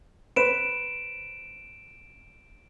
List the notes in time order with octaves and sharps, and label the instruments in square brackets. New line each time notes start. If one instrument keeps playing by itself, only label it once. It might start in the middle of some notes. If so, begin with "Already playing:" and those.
[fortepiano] B4 C5 [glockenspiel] D7 E7